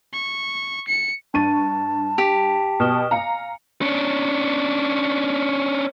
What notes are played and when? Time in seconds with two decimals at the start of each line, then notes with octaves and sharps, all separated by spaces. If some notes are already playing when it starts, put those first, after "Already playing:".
0.13 C#6
0.88 C#7
1.34 G2 D4 A5 C#6 A6 D#7
2.18 G4 B6 F7
2.80 B2 F6 E7 G7
3.11 F5 G#5 A#5 C#7
3.81 C#4 D4